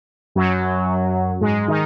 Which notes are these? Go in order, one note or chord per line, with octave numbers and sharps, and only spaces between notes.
F#2 F#3
G#2 G#3
D#3 D#4